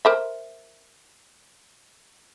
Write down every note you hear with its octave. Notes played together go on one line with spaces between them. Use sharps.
A#4 C5 E5